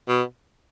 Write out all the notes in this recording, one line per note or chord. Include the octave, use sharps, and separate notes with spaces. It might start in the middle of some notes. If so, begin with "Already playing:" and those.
B2